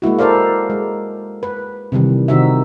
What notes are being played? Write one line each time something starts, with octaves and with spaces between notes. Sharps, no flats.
G#3 A#3 E4 F#4
E4 A4 A#4 C5 D5 F5
G#3
B4
C3 D#3 E3 G3
C3 D#3 C4 D#4 F#4 E5